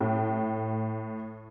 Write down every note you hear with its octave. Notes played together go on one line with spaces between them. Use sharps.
A2